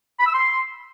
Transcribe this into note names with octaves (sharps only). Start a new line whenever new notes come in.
B5
E6
C6